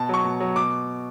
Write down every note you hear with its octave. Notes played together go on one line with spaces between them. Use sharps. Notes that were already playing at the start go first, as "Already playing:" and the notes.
Already playing: B2 A5
F#3 C#6
B2
F#3
B2 D6